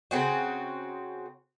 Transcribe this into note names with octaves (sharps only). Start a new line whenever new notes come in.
C#3 C4 F#4